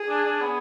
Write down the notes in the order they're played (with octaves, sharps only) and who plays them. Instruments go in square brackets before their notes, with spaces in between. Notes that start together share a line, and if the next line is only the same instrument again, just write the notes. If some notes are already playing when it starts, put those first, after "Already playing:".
Already playing: [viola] G#4
[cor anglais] D4
D4
B3